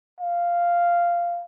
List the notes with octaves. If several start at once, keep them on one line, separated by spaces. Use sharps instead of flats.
F5